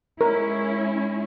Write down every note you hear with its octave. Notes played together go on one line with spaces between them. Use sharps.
G#3 C#4 E4 A#4